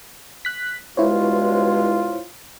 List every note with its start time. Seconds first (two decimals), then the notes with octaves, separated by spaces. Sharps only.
0.45 F#6 B6
0.97 G2 B2 G#3 E4 F4 C5 C#5